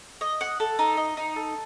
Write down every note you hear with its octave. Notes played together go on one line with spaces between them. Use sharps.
D#5
F#5
A4
D#4
D#5
D#4
A4